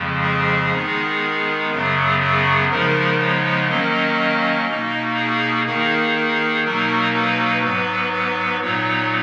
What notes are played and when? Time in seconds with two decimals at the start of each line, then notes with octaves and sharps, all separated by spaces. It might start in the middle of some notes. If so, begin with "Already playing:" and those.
Already playing: F2 C#3 F3 G#3
0.24 G#4
0.73 D#3 G#3 B3 D#4
1.71 F#2 C#3 F#3 B3 G#4
2.21 G#4
2.70 C#3 F3 G#3 B3 D#4 A#4
3.19 C#5
3.68 D#3 F#3 A#3 C#4 D#5
4.67 B2 A#3 D#4
5.16 G#4
5.66 D#3 A#3 D#4 G#4
6.15 G#4
6.65 B2 F#3 A#3 D#4 A#4
7.14 B4
7.64 G#2 F#3 B3 B4
8.12 B4
8.62 A#2 F#3 B3 D#4 C#5